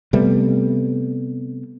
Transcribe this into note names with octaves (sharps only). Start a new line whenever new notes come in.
C3 G3 A3 B3